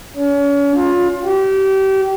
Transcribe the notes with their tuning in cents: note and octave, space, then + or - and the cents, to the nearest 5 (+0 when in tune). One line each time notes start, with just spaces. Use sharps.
C#4 +35
F4 +25
G4 -30